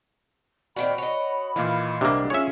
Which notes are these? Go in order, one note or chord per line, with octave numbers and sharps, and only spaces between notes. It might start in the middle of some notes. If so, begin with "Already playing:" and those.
A#2 D#3 C4 F#4 B5 D7
C#5 D#5
A#2 D#3 E3 F5
C2 C3 A#3 D4
C#4 F4 G#4 C#5 E5